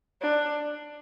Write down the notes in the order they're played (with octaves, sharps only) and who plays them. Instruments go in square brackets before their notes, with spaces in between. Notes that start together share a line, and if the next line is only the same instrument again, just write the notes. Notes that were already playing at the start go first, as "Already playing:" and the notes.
[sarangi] D4